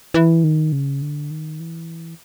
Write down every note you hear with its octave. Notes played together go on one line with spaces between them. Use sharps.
E3
D#3
C#3
D3
D#3
E3